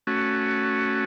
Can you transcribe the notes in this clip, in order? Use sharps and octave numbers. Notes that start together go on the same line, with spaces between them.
A3 C#4 F#4